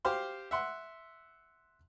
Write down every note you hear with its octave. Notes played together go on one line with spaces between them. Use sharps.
G4 C5 F5 C6
E5 F#5 C6